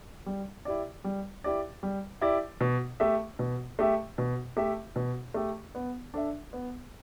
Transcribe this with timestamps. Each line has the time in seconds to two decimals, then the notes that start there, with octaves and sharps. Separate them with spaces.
0.26 G3
0.65 E4 G4 D5
1.04 G3
1.44 E4 G4 D5
1.83 G3
2.21 E4 G4 D5
2.61 B2
3.00 A3 G4 E5
3.39 B2
3.79 A3 G4 E5
4.18 B2
4.57 A3 G4 E5
4.96 B2
5.34 A3 G4 E5
5.75 B3
6.14 D4 A4 E5
6.53 B3